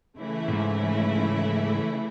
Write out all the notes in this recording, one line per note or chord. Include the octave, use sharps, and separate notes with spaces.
C#3 E3 A3 E4
A2
G#2